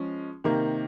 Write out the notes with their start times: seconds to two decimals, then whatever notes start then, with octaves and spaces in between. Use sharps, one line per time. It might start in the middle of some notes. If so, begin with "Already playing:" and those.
Already playing: F3 G#3 C#4
0.44 C3 D#3 A#3